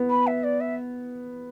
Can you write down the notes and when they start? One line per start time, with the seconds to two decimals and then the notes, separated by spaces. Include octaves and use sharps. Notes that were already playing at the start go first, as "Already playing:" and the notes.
Already playing: B3
0.10 B5
0.27 E5
0.44 D5
0.60 E5